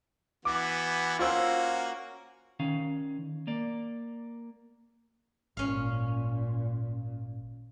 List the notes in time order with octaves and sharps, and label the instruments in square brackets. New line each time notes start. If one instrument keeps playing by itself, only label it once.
[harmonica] E3 B3 F#4 [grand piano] D6
[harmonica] A#3 C#4 F#4 [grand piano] F4 C5 E6
[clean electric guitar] D#3 C#4 F5
A#3 D5
[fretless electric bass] G#1 [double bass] A#2 [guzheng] C#4 F5